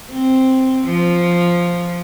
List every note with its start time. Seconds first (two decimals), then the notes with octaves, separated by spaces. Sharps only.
0.10 C4
0.85 F3